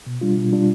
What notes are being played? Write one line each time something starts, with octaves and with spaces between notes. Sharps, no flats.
B2
G3 D4 F4
B2
G3 D4 F4